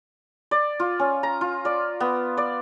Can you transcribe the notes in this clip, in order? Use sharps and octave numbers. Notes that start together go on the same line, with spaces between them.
D5
F4
C#4
A#5
F4
D5
B3
D5